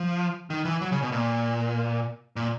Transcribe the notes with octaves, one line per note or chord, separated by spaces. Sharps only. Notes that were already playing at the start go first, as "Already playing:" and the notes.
Already playing: F3
D#3
E3
F#3
C#3
B2
A#2
A#2